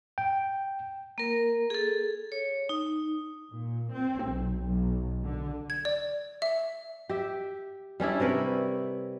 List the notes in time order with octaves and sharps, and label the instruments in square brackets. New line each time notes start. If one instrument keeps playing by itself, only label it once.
[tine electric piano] G5
[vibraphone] A#3 A#4
G#4 A4
C#5
D#4
[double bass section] A#2
C4
B1
B1
D3
[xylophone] G#6
D5
E5
[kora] G4 E5
G3 C#4 D4 E4
C3 A#4 B4 C#5